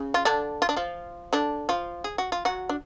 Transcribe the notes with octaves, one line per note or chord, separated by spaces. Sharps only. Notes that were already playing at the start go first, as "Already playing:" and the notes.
Already playing: C#3
F4
D3 D4
F4
D4
F3 F4
D3 D4
F3 F4
G#4
F#4
F4
F#3 F#4
D4